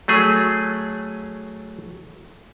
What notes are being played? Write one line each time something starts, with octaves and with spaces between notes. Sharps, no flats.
F#3 A3 G#4